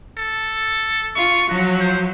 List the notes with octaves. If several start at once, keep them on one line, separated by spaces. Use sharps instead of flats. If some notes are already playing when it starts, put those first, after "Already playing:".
A4
F4 C#6
F3 F#3 F#4
C5